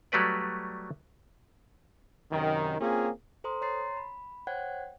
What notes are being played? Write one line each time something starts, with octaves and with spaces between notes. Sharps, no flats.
F#3 G3 A3 B4 D5
F#2 C3 D#3
A#3 C4 C#4 F4 G#4
A4 C5 A#5 C6 D#6
C#5 A#5 C6 A6 C7
B5
C5 C#5 F#5 G5 F#6 G#6